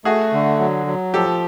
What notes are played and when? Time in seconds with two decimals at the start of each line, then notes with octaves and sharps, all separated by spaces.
0.05 A3 F#4 G#4
0.33 D3
0.59 F#3
0.87 F#3
1.14 F3 G4 A4